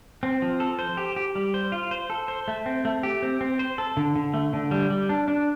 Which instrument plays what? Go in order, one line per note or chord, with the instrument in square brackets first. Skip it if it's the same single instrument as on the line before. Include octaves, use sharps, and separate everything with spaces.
[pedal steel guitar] C4
F3
A4
C5
G4
G4
G3
C5
F4
C5
A4
C5
A3
C4
A3
G4
C4
C4
C5
A4
D3
D3
A3
D3
G3
G3
D4
D4